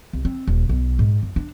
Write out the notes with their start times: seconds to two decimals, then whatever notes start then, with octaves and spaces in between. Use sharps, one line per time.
0.13 C2
0.25 C4
0.48 D#1
0.69 B1
0.99 G#2
1.23 F#2
1.36 D4